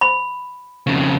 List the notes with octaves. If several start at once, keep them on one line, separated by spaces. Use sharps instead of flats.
B5
F2 C#3